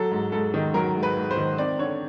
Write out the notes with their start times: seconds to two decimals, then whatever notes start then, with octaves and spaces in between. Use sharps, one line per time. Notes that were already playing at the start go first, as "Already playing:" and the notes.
Already playing: F#3 A4
0.11 G#2
0.32 G#2 A4
0.54 D#3
0.74 F#3 A#4
0.95 G#2
1.03 B4
1.17 G#2
1.31 C5
1.37 D#3
1.58 C4 D5
1.79 D3 C#5